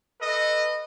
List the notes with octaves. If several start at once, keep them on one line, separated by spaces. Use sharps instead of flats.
A4 B4 D#5